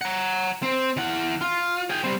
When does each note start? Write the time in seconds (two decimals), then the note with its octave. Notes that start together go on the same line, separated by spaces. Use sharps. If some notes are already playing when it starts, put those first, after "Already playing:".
0.01 F#5 A#5
0.63 C4
0.97 E3 F#5
1.41 F4
1.90 G#4 G5
2.04 G3 C4